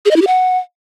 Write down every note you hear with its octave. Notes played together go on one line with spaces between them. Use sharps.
G#4
D#5
E4
G4
F#5